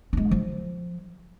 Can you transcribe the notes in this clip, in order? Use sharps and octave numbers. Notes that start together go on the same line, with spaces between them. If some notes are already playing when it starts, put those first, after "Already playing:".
G#3 D4
F3